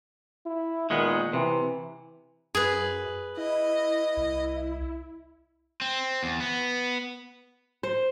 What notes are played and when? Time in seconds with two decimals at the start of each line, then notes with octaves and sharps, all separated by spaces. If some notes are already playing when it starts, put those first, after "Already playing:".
0.46 E4
0.90 A#2 D#3 G#3 B3
1.33 C3 E3
2.55 F#2 G#4 B4
3.37 E4 D#5
4.17 C2
5.81 C4
6.23 E2
6.40 B3
7.83 C5